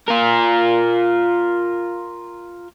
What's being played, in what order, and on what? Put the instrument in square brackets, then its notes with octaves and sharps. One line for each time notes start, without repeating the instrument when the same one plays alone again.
[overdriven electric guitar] F4 A#4